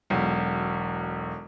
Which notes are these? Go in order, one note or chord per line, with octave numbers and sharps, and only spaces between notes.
E1 B1